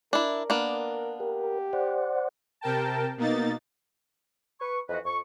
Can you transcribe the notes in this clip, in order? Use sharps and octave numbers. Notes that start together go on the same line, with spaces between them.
D4 E4 A#4
A#3 B3 D4
G4 A#4
C5 D5 F#5
C3 A#4 G5 A5
B2 A#3 D#4 A6
B4 C#6
F2 E3 F#4 B4 D#5
F2 C#6